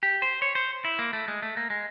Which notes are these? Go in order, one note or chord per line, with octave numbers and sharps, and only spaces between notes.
G4
C5
C#5
C5
E4
A#3
A3
G#3
A3
A#3
G#3